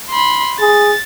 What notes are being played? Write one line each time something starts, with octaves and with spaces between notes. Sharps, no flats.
B5 C6
G#4 A6